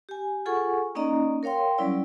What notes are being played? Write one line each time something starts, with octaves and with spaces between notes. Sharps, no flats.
G4 G#5
F4 G#4 A4 F#5 G#5 C#6
A#3 C#4 D#4 D5 D#5 A#5
A#4 C#5 F5 G5 C6
F#3 G3 C#4 E4 D5